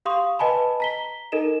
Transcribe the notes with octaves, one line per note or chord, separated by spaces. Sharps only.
G4 F5 C6 C#6 D#6
B4 D#5 G#5 A5 B5
A#5 B6 G7
D#4 A4 A#4 D#5 E7